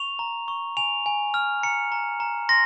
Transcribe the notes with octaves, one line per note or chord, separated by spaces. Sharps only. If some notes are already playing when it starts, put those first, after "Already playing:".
Already playing: C#6 F7
A#5
C#6
G#5 F7
G#5
F6
A#5 C#7
A#5
A#5
C6 A#6